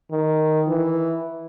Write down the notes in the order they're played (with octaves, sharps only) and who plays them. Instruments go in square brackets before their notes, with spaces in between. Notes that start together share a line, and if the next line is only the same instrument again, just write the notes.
[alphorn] D#3
E3